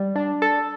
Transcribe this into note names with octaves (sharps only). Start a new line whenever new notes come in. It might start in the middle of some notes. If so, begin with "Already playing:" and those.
Already playing: G3
D4
A4